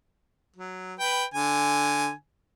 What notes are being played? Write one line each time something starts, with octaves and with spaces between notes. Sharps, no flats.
F#3
B4 G5
D3 G#5